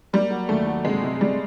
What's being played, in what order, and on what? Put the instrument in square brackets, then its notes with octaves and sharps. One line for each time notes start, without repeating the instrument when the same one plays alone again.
[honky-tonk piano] G3 [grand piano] A#3
[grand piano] F#3
[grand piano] D#2 [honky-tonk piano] A3
[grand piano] F#3
[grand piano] C3 [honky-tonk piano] G#3
[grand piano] C3
[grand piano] C3 [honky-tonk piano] G3